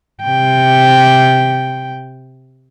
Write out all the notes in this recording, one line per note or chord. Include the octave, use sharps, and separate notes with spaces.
C3 G5